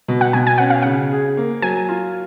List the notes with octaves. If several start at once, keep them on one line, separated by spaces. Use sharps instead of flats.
B2
F#5
B2 G#5
G#5
C#4 F#5
F5
C#3 F#5
G#4
A#3
F#3 G#5
F4